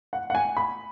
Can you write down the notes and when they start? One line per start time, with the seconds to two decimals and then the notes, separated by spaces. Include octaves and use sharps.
0.13 F#5
0.30 F#5
0.35 G#5
0.57 B5